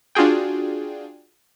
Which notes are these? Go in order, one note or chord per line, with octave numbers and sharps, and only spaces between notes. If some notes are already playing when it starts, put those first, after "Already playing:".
D4 F4 F#4 G#4 G5